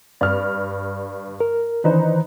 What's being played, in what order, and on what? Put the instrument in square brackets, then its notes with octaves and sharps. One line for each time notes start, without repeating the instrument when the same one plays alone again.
[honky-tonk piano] G2 F6 [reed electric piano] D5
[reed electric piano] A#4
[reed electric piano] D#3 E3 C5 [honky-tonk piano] D4 D#4 B4